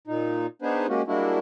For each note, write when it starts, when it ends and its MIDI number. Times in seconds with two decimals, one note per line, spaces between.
0.07 0.46 46
0.07 0.46 63
0.62 0.87 59
0.62 0.87 62
0.62 0.87 63
0.62 0.87 68
0.62 0.87 71
0.62 0.87 72
0.88 1.02 56
0.88 1.02 58
0.88 1.02 61
0.88 1.02 66
0.88 1.02 67
1.07 1.39 55
1.07 1.39 56
1.07 1.39 58
1.07 1.39 62
1.07 1.39 64
1.07 1.39 66